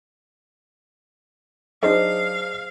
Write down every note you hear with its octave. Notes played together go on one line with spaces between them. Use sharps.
F#3 D4 D#4 G#4 C5 D#5 F5